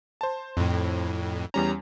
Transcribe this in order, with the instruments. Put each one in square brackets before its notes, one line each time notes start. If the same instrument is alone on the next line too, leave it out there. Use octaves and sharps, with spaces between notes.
[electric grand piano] C5 A5
[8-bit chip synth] F2 A2
[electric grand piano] E2 G3 C#4 [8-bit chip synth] A#5